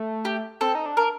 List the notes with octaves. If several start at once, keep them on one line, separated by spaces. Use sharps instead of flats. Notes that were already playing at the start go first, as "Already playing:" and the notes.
Already playing: A3
G4
C4 A4
D#4
D4
A#4